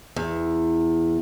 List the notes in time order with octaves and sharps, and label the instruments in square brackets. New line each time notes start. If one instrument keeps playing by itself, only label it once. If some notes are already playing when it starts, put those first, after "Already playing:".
[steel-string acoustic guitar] E2